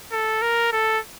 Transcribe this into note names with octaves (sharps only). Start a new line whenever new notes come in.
A4
A#4
A4